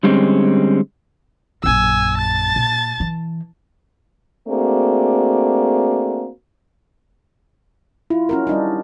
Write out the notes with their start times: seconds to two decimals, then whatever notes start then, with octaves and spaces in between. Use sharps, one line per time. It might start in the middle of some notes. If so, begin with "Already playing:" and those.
0.03 D3 G3 G#3 C4 C#4
1.64 A#1 F#2 G#5 E6
2.17 A5 A6
2.56 A#2
3.00 E3
4.49 A3 A#3 C4 D4 F#4 G#4
8.10 E4 F4
8.29 C#4 F#4 A#4
8.47 G3 D4 D#4